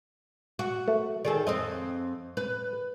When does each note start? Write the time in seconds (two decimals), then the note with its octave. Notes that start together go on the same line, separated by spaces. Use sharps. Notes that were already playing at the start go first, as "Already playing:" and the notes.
0.59 F#4
0.88 A3
1.25 D#3 G#4 A4 D5
1.47 F2 C4 D#5
2.37 B4